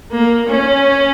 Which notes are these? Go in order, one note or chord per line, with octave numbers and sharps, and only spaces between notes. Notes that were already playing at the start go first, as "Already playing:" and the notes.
A#3
C#4